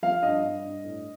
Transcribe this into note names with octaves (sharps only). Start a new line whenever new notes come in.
F3 F5
G2 D#5
G2
G2
A2